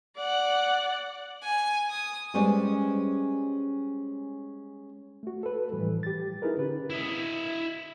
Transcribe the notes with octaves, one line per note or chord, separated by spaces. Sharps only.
D5 F#5
G#5
D#6
G3 G#3 C#4 B4 C5 D5
A3 F#4
A4 B4
A2 E3 F3 G3
G4 A6
D#4 E4 G#4 A#4 B4
D3 C#4 G4 B4
E4 D#5